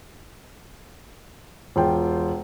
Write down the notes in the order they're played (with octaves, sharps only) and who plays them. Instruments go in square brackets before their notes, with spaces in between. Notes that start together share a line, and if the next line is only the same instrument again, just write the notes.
[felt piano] E1 F4 G5